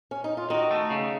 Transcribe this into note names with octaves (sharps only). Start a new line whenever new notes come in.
C#4
D#4
F4
D#3 D#4 F#4
A3
C#3